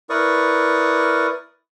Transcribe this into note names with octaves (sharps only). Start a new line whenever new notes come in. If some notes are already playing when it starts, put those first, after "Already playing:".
E4 A#4 B4 D5 C#6 D#6